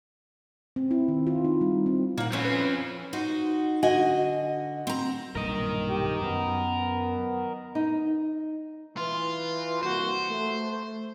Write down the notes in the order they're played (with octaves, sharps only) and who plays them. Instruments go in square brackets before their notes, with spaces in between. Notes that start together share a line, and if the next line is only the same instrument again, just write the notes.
[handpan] C4
E4
D#3
F4
D#4
G3
C4
[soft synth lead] A#2 [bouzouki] A#3 F#5
[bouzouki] E3 C#4 C5 [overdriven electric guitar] F3 C4
[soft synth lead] B4
[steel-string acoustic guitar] D#4 F#4 C5
D3 F#4 D#5 G#5
C4 A#5
[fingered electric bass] B1 G2 A#2 [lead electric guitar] A#4 D#5
[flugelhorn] G4
[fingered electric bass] F#2 [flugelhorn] B3
[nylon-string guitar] D#4
[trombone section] E3 [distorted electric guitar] F4
[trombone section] C2 A#3 F#4 [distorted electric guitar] C5
[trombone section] A3